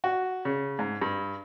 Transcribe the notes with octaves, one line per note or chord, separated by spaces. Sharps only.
F#4
C#3
G#2
G2